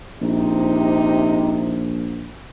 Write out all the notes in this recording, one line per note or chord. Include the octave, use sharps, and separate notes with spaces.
A#1 C3 D#4